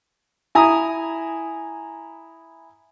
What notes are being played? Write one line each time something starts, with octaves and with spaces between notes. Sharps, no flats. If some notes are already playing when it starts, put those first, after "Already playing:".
E4 G#5 A#5 D#6